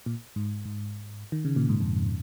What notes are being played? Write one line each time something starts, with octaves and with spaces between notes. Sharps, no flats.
A#2
G#2
G#2
D#3
C#3
A#2
G#2
F2